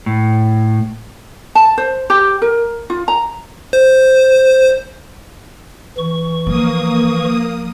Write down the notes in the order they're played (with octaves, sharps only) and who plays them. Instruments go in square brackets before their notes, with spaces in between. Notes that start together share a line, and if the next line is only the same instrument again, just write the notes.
[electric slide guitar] A2
[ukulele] A5
C5
G4
A#4
F4
A#5
[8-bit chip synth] C5
[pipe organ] E3 C#6
[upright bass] F3 [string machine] A#3 D#6